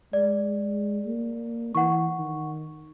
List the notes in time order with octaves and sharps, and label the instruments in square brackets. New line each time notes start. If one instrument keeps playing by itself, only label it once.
[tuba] G#3 [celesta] D5
[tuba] A#3
[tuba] E3 [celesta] F#5 C#6
[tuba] D#3